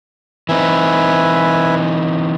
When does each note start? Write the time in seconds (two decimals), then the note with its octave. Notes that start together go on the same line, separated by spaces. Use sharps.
0.49 E3 C4 D#4 B4 E5 G#5